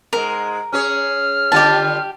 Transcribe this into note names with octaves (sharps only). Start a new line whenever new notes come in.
G#2 G#3 A#4
C#4 G#4 C#5 F6
D3 G3 F4 G4 A5